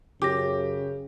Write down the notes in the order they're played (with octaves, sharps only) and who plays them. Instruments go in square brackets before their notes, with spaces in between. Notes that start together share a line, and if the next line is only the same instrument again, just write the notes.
[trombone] F#2 [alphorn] C#3 [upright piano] G4 [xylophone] D6 A#6